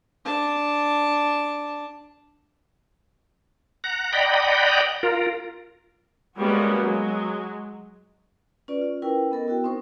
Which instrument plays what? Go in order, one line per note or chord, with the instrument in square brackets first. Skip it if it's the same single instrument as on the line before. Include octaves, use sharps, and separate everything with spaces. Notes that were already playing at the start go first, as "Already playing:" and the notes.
[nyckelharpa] D4 A5
[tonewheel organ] F#5 A#5
D5 D#5 F#5 G5 A#5 B5
F4 A#4
[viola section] G3 G#3 A#3 B3 C#4 F#4
F#3 G#3
[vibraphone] C#4 F4 B4 D5
F4
C#4 E4 A#4 B4 G5
B3 A4 A#4 D#5
B3 E4 F#4 G5
C4 D#4 A#4 C5 C#6